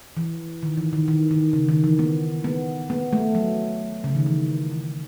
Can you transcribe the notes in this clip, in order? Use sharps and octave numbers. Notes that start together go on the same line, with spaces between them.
E3
D#3
E3
D#3
D#3
D#3
C#3
D#3
E3
B3
B3
B3
A3
F#3
C#3
D#3
E3
E3